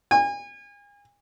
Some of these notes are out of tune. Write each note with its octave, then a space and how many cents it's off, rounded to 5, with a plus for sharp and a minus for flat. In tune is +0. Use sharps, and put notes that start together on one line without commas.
G#5 -35